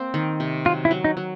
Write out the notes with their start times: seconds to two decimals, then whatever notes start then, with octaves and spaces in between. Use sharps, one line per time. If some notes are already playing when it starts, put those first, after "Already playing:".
Already playing: A#3 C4
0.14 D#3
0.40 C3
0.65 F#3 F4
0.85 E4
0.91 F#3
1.04 D#4
1.17 F#3